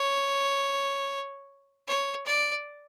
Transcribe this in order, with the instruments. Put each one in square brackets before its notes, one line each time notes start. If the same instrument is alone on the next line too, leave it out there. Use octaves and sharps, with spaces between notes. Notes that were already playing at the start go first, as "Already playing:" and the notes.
Already playing: [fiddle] C#5
C#5
D5